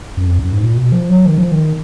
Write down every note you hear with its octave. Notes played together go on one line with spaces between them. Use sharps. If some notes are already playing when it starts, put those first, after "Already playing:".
F#2
F2
F#2
G#2
A#2
B2
F3
F#3
D#3
F3
D#3